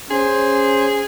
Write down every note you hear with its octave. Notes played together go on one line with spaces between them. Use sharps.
C#4 G#4 C5